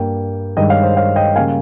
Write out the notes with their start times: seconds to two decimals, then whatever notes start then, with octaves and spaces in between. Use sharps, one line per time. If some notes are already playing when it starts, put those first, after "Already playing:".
Already playing: G2 G3 A#3 G5
0.57 G2 D#3 G#3 D#5 G5
0.70 C#5 F5
0.83 C5 D#5
0.96 C#5 F5
1.16 D#5 G5
1.35 C#3 G3 A#3 F5 G#5